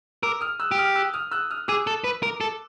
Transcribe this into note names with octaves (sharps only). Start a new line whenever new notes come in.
A#4 D6 E6
D#6 F6
E6 F#6
G4
D#6 F6
E6 F#6
D#6 F6
E6 F#6
D#6 F6
G#4 D6 E6
A4
B4
A#4
A4